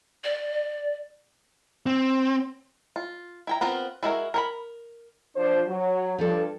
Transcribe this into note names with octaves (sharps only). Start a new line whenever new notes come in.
D5
C4
F4
E4 G5 A#5
B3 C4 F4 A#4
G#3 E4 F#4 G#4 A#4
A#4 C#5 B5
F3 D4 C5
F#3
G2 F3 A4